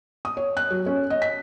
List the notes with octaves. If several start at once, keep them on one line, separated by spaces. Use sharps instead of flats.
D#6
C#5
F#6
F#3
C#4
D#5
B6